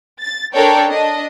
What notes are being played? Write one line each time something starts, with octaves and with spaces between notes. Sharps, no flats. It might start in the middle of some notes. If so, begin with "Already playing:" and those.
A6
D4 A4 A#4 C#5 D5 G5
D4 D#5